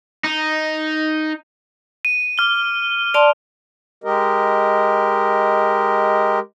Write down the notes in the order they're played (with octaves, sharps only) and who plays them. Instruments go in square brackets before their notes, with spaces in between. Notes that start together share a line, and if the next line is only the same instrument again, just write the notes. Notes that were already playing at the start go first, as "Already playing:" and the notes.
[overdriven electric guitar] D#4
[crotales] D#7
D6 F6 G7
[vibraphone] D5 A5 C6 [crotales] F7
[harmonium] G#3 G4 A#4 D#5